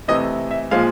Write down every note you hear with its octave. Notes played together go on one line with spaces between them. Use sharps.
C3 E3 A3 D#5
E5
A#2 F3 G#3 F5